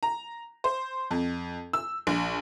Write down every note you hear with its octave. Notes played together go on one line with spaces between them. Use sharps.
A#5
C5
F2
E6
A#1